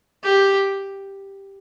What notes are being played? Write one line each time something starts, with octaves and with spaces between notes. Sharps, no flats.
G4